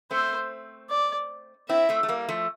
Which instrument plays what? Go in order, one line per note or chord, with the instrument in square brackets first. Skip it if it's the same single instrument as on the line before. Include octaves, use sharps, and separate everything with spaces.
[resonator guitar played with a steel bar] A3 C4 [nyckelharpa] C5
[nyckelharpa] D5
[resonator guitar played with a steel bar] C4 E4 [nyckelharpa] E5
[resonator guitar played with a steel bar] A3 C4
A3
G3 A#3
F3 A3